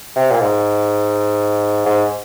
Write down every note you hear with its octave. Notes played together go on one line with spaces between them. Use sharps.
C3
A#2
G#2
G#2